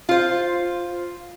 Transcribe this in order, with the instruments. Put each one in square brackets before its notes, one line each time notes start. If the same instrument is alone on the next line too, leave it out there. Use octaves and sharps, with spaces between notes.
[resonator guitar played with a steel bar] F4 C5